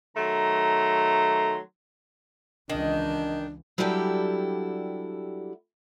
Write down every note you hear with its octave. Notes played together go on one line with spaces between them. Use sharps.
D#3 F#3 A3 A#5 C6
C#2 D#3 E3 D4 D#5
F#3 G3 D4 E4 G4 A4